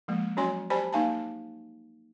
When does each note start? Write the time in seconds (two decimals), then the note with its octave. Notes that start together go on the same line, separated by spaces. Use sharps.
0.08 F3 G#3 A#3
0.37 F#3 C#4 F#4 C#5 G#5 C6
0.70 G4 C5 D5 G#5 A5 B5
0.93 A#3 D#4 F5 G#5 A5